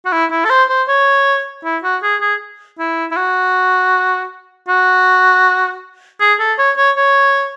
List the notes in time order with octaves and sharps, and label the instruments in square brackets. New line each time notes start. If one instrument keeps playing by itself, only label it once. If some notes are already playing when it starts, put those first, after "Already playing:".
[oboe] F#4
E4
E4
A4
C5
C5
C#5
E4
F#4
G#4
G#4
E4
E4
F#4
F#4
G#4
A4
C#5
C#5
C#5